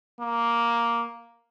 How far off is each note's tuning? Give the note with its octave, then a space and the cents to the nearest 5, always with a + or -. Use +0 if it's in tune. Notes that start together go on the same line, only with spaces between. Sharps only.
A#3 +5